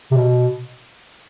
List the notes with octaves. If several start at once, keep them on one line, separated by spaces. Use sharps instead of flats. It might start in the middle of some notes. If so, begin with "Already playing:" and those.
C3
B2